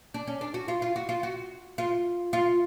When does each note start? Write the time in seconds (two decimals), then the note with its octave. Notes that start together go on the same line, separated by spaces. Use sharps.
0.14 D4
0.27 C#4
0.41 D4
0.54 F#4
0.68 F4
0.82 F4
0.96 F#4
1.09 F4
1.23 F#4
1.78 F4
2.33 F4